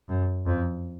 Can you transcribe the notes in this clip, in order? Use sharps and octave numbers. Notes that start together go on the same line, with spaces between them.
F#2
F2